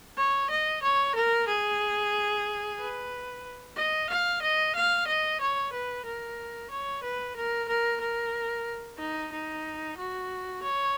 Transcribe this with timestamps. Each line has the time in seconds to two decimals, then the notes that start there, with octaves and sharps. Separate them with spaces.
0.17 C#5
0.50 D#5
0.82 C#5
1.15 A#4
1.48 G#4
2.79 B4
3.76 D#5
4.10 F5
4.42 D#5
4.75 F5
5.07 D#5
5.40 C#5
5.72 B4
6.05 A#4
6.70 C#5
7.03 B4
7.36 A#4
7.68 A#4
8.01 A#4
8.98 D#4
9.32 D#4
9.97 F#4
10.62 C#5